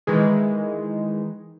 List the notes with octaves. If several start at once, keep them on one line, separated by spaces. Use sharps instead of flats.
D#3 E3 G#3